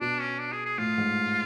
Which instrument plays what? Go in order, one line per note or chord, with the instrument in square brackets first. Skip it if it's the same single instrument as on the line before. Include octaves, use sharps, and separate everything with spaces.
[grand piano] B2 [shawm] D4
[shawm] C#4
D4
G#4
G#4
[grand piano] A2 [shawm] F4
[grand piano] G#2